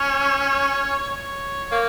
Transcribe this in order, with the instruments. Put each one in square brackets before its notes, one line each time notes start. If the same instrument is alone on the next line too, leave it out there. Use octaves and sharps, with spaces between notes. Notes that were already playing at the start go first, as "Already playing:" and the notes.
Already playing: [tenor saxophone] C#4 [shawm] C#5
[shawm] C#5
[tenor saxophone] A#3